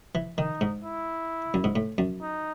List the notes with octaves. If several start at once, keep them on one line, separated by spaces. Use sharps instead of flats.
E3
D#3 D#4
G#2
E4
F#2
G#2
A2
F#2
D#4